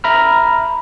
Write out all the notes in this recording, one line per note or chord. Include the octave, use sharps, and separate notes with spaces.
E5 A#5 B5 F6